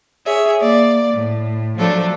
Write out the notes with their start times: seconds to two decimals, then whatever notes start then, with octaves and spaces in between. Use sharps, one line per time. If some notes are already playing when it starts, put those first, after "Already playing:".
0.25 G#4 C#5 E5
0.59 A#3 D5
1.13 A2
1.78 F3 F#3 A3 D4 A4